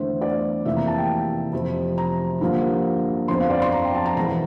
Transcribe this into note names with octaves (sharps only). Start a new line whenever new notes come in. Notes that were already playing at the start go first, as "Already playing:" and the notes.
Already playing: E2 D3 A3 D4 C5
D5
F1 F2 C3 E3 A#3 E5
A#5
A5
G5
F2 C3 F3
A#5
G2 D3 F3 A#3 F4
G1 F2 D3 F3 C4 C6
F5
D5
C6
A#5
G5
A5
A#5
E1 E2 E3 A#5